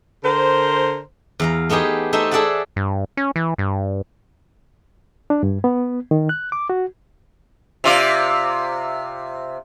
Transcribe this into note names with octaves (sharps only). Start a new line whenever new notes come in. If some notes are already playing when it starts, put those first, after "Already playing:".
D3 A#4 C5
E2 F5 A#5
A3 B3 D#4 G4 G#4
A3 D#4 C5 E5
G#4 A4 D5 E5 F#5 A5
G2
C#4
E3
G2
D4
G2
B3
D#3
F#6
D6
F#4
C3 F4 D5